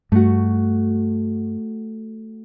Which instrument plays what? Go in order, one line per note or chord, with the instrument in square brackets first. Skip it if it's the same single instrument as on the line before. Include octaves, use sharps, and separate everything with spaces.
[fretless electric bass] G2 [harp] A3 F#4